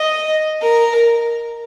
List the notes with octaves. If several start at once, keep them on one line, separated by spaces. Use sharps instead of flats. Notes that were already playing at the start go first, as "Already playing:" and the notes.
Already playing: D#5
A#4